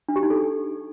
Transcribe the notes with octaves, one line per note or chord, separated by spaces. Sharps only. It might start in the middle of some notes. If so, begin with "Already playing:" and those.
D4
G4
D#4
A4